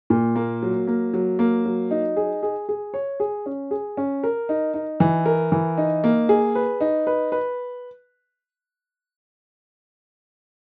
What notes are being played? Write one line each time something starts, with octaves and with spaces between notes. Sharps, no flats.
A#2
A#3
F#3
A#3
F#3
A#3
F#3
D#4
G#4
G#4
G#4
C#5
G#4
C#4
G#4
C#4
A#4
D#4
D#4
E3
A#4
E3
D#4
A#3
G#4
B4
D#4
B4
B4